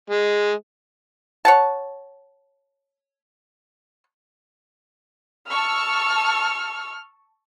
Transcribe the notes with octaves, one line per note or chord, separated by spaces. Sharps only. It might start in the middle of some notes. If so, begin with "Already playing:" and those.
G#3
C#5 F#5 A5
A5 C#6 E6 F6